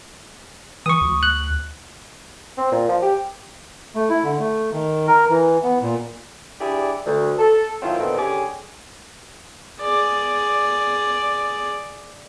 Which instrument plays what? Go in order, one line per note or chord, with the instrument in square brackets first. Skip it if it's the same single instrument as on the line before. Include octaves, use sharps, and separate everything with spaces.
[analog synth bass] E3 [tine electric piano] C#6 D#6
[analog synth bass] D2
[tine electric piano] F#6
[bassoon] C4
A#2
F3
G4
[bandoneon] A3
E4
D3
A3
D#3
A#4
E3
B3
A#2
[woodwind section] D4 E4 G4 G#4 D5
D2
A4
D#3 F3 F#3 C4 E4 F4
A#2 D3 D#3 A3 B3 C4
D3 C#4 G4 G#4 G#5 D6
[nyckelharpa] G#4 D5